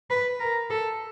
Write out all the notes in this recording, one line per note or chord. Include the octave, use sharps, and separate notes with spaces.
B4
A#4
A4